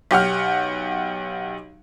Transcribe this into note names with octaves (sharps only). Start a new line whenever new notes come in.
B1 G4 F#5 F6